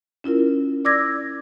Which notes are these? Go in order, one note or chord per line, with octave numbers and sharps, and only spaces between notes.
C#4 E4 F4 A#4
D5 D6 E6 G#6 A#6